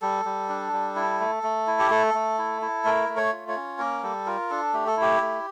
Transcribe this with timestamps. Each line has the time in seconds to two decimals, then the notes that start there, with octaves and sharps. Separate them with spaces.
0.02 G3 A4
0.25 G3
0.49 D4
0.73 G3
0.96 E4
1.20 A3
1.43 A3
1.67 E4
1.79 G4
1.90 A3 A4
2.14 A3
2.38 E4
2.62 E4
2.85 A3 A#4
3.09 A3
3.17 C#5
3.33 F4
3.48 C#5
3.56 C#4
3.79 A#3 A#4
4.03 G3 A4
4.26 F4 A#4
4.50 D4 A4
4.73 A3 G4
4.87 A4
4.97 E4 G4
5.21 A3